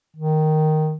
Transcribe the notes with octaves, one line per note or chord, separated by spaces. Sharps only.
D#3